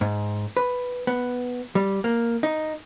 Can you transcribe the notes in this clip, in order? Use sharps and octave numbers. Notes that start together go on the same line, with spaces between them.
G#2
B4
B3
G3
A#3
D#4